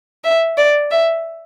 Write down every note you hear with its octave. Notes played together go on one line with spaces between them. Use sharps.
E5
D5
E5